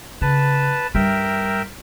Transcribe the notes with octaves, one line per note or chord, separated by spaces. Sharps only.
C#3 B4 A5
G2 G3 A#4 E5 G5